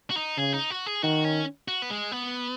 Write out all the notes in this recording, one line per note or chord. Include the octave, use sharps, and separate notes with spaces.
F#4
D#4
C#3 G#4
D#4
F#4
G#4
D#3 F#4
C#4
F#4
B3
G#3
B3